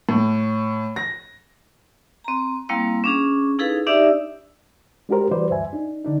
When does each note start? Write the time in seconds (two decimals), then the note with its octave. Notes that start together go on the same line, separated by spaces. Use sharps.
0.09 A2
0.96 A#6
2.24 C4 A#5
2.69 G3 A#3 C4 E4 F5
3.04 C#4 D4 G#4
3.59 D#4 E4 G#4 A4 B4 F5
3.87 D4 D#4 G4 D5 E5 E6
5.09 G#3 D4 F#4 G4 A#4 C5
5.31 E3 G3 F#4 B4 C5 D5
5.50 D2 G2 E5 G#5
5.73 D4 D#4
6.04 D3 D4 D#4